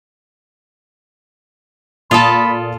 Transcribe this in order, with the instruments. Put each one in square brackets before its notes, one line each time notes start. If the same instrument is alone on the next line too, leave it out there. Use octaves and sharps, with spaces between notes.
[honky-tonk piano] A#2 D#6 [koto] F4 A4 [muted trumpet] B5